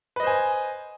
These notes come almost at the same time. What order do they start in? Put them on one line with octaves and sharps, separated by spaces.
B4 D#5 C5 G#5